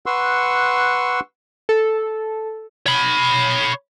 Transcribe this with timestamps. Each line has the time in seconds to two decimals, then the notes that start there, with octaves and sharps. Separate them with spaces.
0.06 B4 F#5 C6 C#6 E6
1.69 A4
2.86 C#5 B5